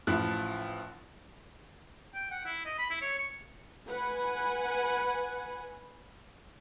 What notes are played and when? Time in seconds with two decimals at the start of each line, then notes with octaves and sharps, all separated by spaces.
0.07 A1 F3 E4 F#6
2.14 G5
2.31 F#5
2.46 E4
2.66 D#5
2.79 B5
2.90 E4
3.02 C#5
3.19 C#6
3.88 B4 F#5 G#5